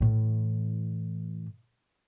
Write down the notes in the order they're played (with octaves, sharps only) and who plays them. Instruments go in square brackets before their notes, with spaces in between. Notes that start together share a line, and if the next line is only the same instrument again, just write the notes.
[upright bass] A2 E3